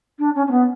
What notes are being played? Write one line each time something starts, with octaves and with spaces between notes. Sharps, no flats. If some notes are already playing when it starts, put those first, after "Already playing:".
D4
C#4
C#4
B3